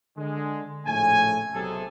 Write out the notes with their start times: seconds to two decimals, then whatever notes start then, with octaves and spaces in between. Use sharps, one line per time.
0.17 D3 G#3
0.86 A#1 A2 C#3 A3 G#5
1.54 B1 C3 G#4 A4